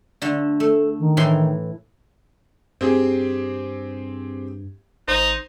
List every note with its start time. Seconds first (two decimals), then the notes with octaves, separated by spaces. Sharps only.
0.22 D3 A3
0.60 A3 A4
0.99 D#3
1.17 A2 E3 C6
2.81 G2 C4 G4 G#4
5.08 G#1 D#4 C5